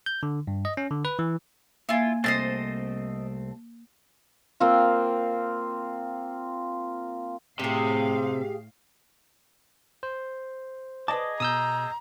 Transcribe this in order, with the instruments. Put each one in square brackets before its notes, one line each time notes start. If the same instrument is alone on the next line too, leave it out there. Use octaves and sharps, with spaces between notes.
[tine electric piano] G6
D3
G2
D#5
C#4
D3
B4
E3
[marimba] A#3 G#5 G#6 [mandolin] E4 F4
[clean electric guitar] C2 A3 C4 [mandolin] C5 D#5 A5
[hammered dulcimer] A#3 C4 F4
[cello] A2 F5 [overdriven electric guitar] C3 [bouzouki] G4 G#4
[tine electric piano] C5
[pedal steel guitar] G#4 D#5 D6 [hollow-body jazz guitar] B4 D5 A5
[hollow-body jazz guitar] B2 [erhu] A#5 [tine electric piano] D#6 E6 G6